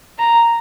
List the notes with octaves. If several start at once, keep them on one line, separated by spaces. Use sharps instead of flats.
A#5